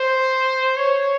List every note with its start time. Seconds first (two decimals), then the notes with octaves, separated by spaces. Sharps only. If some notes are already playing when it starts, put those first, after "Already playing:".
Already playing: C5
0.77 C#5